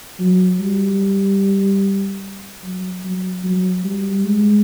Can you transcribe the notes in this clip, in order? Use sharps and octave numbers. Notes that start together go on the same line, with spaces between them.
F#3
G3
F#3
F#3
F#3
G3
G#3